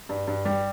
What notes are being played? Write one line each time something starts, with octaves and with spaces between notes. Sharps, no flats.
G2
G2
G3